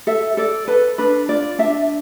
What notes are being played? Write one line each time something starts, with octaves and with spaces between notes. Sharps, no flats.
A4 E5
A4 D5
A4 B4
D4 B4
F4 D5
D4 E5